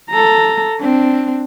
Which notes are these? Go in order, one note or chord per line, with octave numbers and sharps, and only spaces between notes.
A4 A#5
C4 D4